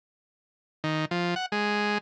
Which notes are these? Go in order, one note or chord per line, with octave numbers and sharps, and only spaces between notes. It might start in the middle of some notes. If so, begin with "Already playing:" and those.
D#3
F3
F#5
G#3